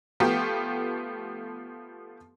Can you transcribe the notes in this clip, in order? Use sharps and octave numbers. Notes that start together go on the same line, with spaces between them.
F3 A3 B3 G4